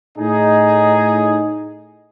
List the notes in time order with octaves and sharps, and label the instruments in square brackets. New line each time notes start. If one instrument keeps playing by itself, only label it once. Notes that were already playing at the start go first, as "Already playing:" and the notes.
[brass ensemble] A2 D#4 G#4